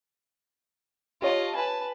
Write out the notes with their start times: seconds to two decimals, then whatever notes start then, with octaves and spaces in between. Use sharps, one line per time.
1.22 F4 G4 C#5 D#5 A5
1.55 B4 G#5 A5